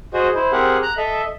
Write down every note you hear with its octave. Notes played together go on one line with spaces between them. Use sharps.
F#4 G#4 C5 D#5
E4 C5
C4 G4 G#4 A#4 F#5
A#5 F#6
A4 D#5 E5